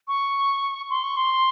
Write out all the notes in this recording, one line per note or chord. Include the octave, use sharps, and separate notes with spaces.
C#6
C6
C#6
C6